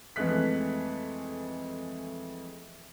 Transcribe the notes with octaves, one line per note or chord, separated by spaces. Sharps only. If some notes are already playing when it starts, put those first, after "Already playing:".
F2 E3 G#3 A3 F#6 B6